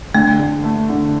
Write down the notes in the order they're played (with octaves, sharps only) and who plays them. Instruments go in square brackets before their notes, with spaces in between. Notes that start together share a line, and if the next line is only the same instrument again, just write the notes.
[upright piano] D3 [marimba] A3
[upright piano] D3
A3
D3